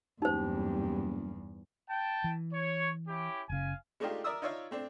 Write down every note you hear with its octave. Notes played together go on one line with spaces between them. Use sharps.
F#1 E2 G2 D#4 G4 C5
G5 A5
E3
C#5
C#4 E4 G4
F#1 C#3 F5 G#5
G#3 A3 D4 D#4 F4 G4
A#4 D5 E5 D#6 E6
D#4 F4 C#5 D5 E5 F5
A3 C4 D4